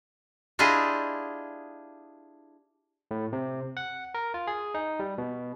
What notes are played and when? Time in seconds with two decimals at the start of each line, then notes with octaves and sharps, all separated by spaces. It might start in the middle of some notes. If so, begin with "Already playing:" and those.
0.59 D4 E4 F4 G4 G#4 D#5
3.11 A2
3.33 C3
3.77 F#5
4.14 A#4
4.34 F4
4.47 G#4
4.74 D#4
5.00 G3
5.18 B2